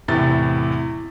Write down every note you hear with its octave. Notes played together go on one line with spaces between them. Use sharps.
E2 A2 C3 A6